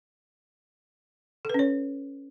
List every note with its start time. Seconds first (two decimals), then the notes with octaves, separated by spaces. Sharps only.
1.45 A4
1.50 B4
1.54 C#4
1.59 C#5